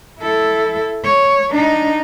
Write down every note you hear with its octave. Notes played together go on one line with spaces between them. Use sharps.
E4 A4
C#5
D4 D#4